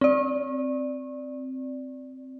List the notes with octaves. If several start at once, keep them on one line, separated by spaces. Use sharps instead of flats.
C4 D5